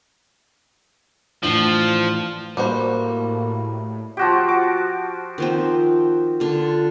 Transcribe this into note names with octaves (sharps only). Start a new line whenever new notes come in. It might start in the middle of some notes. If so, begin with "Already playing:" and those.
A2 E3 F3 D4
A2 G3 A#3 F#4 C5
F3 F#4 G4
D6
D#3 F3 C4
D3 F4